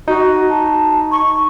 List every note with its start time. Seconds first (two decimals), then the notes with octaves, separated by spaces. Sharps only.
0.08 D#4 F#4
0.50 A5
1.12 C#6